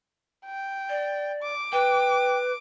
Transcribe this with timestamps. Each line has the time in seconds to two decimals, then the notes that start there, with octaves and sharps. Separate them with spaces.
0.45 G5
0.89 D5
1.43 D6
1.73 B4 G5